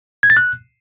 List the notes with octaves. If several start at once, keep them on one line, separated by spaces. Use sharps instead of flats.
G#6
A6
F#6